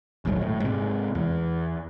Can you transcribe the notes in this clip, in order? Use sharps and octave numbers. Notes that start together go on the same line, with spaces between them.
G#1 D#2 G#2 F#3
A2
G#2 C3
E2